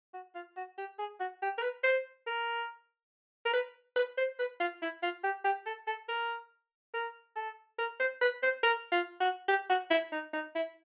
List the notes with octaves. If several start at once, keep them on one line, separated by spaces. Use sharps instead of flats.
F#4
F4
F#4
G4
G#4
F#4
G4
A#4
B4
C5
A#4
A#4
B4
B4
C5
B4
F4
E4
F4
G4
G4
A4
A4
A#4
A#4
A4
A#4
C5
B4
C5
A#4
F4
F#4
G4
F#4
E4
D#4
D#4
E4